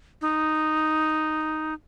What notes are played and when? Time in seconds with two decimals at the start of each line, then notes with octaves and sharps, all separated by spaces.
0.21 D#4